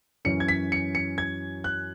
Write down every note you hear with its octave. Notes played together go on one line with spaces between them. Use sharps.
F#2 E3 C#4 C#7
G#6
B6
C#7
C#7
G#6
F#6